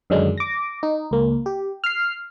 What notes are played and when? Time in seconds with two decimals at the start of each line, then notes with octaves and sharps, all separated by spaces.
0.10 F#2 D3 D#3 F#3 G#3 D4
0.38 D6 A#6
0.83 D#4
1.11 C#2 A#3
1.46 G4
1.84 F6 C7